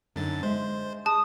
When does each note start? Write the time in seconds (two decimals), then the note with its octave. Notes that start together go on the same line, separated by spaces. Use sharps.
0.16 F#2 D3 D4 D#4 A6
0.43 G#3 C5 E5
1.06 G#4 A5 D#6